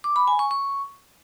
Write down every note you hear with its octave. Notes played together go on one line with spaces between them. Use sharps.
D6
B5
G#5
C#6
C#6